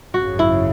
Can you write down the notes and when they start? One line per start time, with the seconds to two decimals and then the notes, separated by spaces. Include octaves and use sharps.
0.14 G#1 F#2 C#3 F#4
0.39 E4